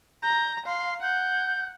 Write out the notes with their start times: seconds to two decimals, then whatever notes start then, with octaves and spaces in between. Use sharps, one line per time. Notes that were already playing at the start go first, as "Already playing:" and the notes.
0.23 A#5 G6
0.66 F5 C6
1.02 F#5 G6